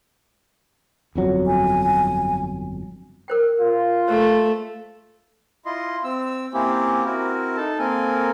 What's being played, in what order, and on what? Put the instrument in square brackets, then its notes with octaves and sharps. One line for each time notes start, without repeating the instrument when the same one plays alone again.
[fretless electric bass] G1 F2 F#3
[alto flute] G#5
[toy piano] A#4 C5 G5
[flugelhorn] F4
[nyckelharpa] A3 [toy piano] C5
[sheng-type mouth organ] E4 F4 D#5 C6
C4 E6
A#3 C4 C#4 E4 G4
C4 E4 F#4 A#4
D#4 A4 A5
A#3 C4 A4 A#4 G#5